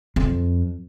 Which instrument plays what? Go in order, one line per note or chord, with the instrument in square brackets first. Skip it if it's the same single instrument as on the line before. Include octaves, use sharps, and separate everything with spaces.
[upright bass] F2